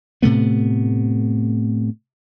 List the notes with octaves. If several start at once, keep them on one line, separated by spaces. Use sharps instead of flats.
A2 C3 A3 B3